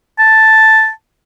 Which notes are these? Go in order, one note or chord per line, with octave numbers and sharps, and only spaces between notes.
A5